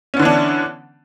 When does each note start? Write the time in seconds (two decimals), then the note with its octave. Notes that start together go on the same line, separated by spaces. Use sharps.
0.14 C#4
0.17 B3
0.19 D3
0.22 E3
0.25 D4